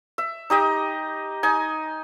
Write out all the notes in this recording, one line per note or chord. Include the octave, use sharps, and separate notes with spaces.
E5
D#4 G4 D#5
D#4 G#5